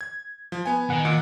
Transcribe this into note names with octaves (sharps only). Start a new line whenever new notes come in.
G#6
F3
B3 G#5
D#3 F#5
A#2 F#5